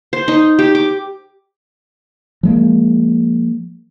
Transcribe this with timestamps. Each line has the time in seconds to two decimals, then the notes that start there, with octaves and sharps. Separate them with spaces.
0.13 C5
0.28 D#4
0.59 G4
0.75 D6
2.43 F3 G#3 A#3